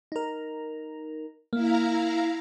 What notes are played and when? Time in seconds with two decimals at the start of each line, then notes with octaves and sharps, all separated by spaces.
0.12 D#4 A#4
1.53 A#3 E4 F5 A#5